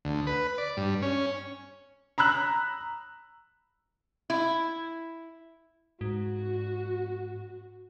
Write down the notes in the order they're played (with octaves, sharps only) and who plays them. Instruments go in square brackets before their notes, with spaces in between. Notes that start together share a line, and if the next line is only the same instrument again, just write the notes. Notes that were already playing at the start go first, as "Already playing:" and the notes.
[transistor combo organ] D2
B4
D5
G2
C#4
[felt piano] A#5 B5 E6 F#6
[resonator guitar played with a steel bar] E4
[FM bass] G#2 [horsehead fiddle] F#4